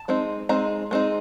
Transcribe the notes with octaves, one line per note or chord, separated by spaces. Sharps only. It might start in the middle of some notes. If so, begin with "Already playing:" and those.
Already playing: A5
G#3 C4 D#4
G#3 C4 D#4 A#5
G#3 C4 D#4